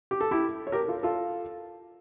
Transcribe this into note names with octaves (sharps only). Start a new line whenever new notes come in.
G4
A4
E4 G4
C#5
G4 A#4
F4 A4
F4 A4